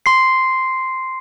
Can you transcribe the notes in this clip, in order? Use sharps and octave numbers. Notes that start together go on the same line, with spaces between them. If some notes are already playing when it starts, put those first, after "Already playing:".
C6 C7